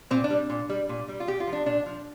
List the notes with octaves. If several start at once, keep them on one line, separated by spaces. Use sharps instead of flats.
A#2 C4
D4
G3
A#2
G3
A#2
G3
F4
A#2 G4
F4
F3
D4
A#2 D4
F3